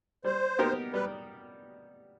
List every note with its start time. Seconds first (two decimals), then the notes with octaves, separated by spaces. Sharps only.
0.24 G3 C5
0.59 B3 D#4 G4 A#4
0.93 G3 B4